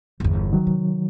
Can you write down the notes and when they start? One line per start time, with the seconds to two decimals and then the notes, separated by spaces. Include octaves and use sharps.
0.20 G1 E2
0.53 D#3 F#3
0.67 C3